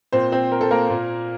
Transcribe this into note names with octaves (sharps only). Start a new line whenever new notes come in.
A#2 C4 C5
C4 C5
A#4
A4
A#3 A#4
A#2